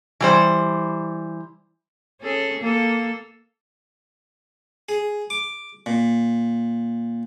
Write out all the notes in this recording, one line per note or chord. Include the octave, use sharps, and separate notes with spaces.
E3 G3 C5
C#4 G#4 A4
A#3 A4
G#4
D6
A#2